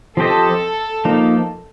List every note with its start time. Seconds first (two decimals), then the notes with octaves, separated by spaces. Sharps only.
0.17 F3 C4 G4 A4 C5 D#5
1.05 F3 A#3 D#4